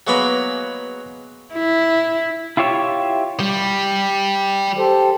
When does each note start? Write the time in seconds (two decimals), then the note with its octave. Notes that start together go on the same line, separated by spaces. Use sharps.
0.07 F#3 G#3 A#3 B3 A#5 B5
1.54 E4
2.57 E4 F4 G4 C#5 E5
3.40 G3
4.78 G4 A4 C5